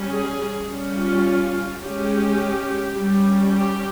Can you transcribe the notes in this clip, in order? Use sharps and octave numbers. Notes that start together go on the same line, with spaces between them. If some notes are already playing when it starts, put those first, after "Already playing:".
Already playing: G3 C#4
G#4
G3 C#4
F4
G#3 C#4 G4
G3 C#4
G4